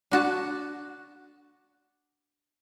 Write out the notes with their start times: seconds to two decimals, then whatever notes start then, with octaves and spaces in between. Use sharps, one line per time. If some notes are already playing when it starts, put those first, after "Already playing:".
0.11 D4 F#4 A5